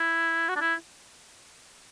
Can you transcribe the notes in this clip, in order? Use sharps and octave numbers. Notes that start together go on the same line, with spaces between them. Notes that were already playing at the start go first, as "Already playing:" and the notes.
Already playing: E4
F#4
D4
E4